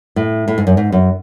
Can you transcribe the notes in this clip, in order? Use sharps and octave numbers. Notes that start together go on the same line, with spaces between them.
A2
A2
G#2
F#2
G#2
F#2